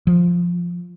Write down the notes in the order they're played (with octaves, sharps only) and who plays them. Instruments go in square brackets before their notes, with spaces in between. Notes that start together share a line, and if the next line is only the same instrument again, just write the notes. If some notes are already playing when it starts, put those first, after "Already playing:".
[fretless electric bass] F3